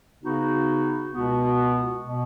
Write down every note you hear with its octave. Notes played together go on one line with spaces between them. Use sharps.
C#3 B3 D#4 F#4
C#2 B2 B3 F#4
B2 B3